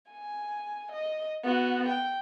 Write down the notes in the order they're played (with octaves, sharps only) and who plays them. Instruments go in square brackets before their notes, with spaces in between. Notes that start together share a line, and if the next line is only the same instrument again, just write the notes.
[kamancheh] G#5
D#5
B3 F#4
G5